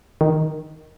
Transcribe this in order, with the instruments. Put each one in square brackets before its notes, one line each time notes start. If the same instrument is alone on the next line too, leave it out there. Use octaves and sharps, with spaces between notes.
[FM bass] D#3